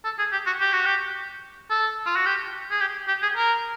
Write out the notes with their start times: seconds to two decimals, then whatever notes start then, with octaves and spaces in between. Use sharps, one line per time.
0.05 A4
0.19 G#4
0.32 G4
0.46 F#4
0.60 G4
0.73 F#4
0.86 G4
1.70 A4
2.06 F4
2.16 F#4
2.26 G4
2.71 G#4
2.81 G4
3.08 G4
3.22 G#4
3.37 A#4